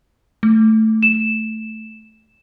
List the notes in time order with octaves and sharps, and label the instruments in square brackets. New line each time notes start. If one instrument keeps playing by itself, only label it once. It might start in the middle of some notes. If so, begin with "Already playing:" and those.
[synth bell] A3
[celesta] E7